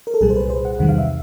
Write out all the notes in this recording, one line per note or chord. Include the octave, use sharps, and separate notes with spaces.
A#4
A4
C2 A#2 G3 G#4
C5
B4
C5
F#5
E2 C3 D#3 G3 F#5
F5
E5